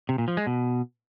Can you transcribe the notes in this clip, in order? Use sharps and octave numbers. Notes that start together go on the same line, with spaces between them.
C3
A#2
F3
G#3
B2